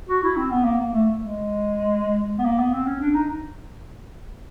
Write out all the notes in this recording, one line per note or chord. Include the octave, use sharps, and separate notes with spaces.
F#4
E4
C4
B3
A#3
A#3
A3
G#3
B3
A#3
B3
C4
C#4
D4
D#4